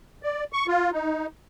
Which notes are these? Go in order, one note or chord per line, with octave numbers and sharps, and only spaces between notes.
D5
C#6
F4
D#4